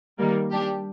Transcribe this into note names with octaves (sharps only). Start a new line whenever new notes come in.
D#3 G3 A#3
G3 D4 G4